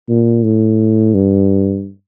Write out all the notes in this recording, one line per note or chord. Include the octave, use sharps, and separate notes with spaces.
A#2
A2
G2